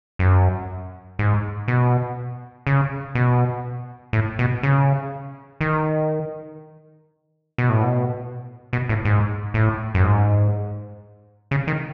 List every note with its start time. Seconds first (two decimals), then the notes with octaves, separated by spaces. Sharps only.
0.19 F#2
1.19 G#2
1.68 B2
2.67 C#3
3.15 B2
4.13 A2
4.39 B2
4.63 C#3
5.61 D#3
7.58 B2
7.70 A2
7.83 B2
8.73 B2
8.89 A2
9.05 G#2
9.54 A2
9.94 F#2
10.03 G#2
11.51 C#3
11.67 D#3